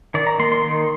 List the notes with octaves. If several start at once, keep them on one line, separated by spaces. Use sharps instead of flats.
D#3 D5
A#5
A#3 C6
C6
D#3